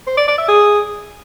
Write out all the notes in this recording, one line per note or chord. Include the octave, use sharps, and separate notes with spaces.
C5
D5
D5
E5
G#4